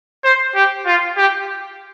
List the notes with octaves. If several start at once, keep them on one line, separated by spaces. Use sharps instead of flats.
C5
G4
F4
G4